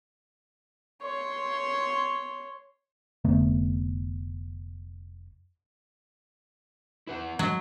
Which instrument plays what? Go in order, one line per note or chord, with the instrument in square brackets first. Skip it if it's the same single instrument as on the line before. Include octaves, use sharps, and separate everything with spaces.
[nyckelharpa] C#5 C6
[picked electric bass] F1 D3 A3 B3
[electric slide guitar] E4 B4 F#5
[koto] F#3 [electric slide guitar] G#3